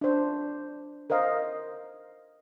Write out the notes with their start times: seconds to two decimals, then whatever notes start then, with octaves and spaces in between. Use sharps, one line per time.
0.01 D4 C5
1.10 A#4 C5 D#5 F5